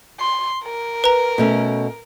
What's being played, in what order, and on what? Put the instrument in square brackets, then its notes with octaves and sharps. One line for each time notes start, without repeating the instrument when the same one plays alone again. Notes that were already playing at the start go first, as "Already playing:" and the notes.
[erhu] C6
A#4
[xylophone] B4 A#5
[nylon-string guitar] B2 A3 C#4